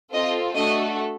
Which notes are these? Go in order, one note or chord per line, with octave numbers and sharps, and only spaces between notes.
C4 F4 A4 D#5
A3 D4 F#4 A4 D#5